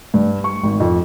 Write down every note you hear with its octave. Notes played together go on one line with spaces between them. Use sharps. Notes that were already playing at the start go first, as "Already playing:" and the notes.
G2
C#6
G#1
F2